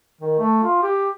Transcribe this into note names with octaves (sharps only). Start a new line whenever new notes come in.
D#3
A3
F4
G4